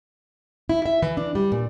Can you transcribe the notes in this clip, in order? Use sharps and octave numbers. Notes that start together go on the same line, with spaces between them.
E4
E5
E3
D4
G3
A#2